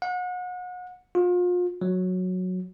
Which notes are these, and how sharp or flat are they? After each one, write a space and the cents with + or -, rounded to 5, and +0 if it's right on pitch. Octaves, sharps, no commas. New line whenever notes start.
F#5 -35
F4 +35
F#3 -10